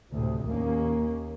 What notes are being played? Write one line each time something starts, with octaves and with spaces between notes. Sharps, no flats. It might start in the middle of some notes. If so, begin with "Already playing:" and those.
D2 A2 C3
D#2 A#3 C#4